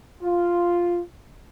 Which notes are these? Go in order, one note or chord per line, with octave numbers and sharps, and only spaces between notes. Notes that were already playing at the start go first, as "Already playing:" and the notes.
F4